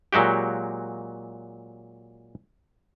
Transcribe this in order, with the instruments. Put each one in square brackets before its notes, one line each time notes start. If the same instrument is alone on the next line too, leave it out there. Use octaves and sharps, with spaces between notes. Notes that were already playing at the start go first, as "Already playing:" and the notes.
[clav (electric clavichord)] A#2 F#3 G#3 F#4 G4